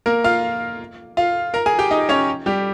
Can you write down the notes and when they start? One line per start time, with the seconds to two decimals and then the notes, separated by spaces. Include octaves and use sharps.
0.06 A#3 A#4
0.24 F4 F5
1.17 F4 F5
1.54 A#4 A#5
1.66 G#4 G#5
1.79 G4 G5
1.91 D#4 D#5
2.09 C#4 C#5
2.46 G3 G4